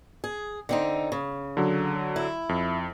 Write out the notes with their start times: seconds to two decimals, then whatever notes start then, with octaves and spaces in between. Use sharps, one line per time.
0.24 G#4
0.69 D3 C4 D#4
1.12 C#3
1.57 D3 F#3
2.16 E4
2.49 F2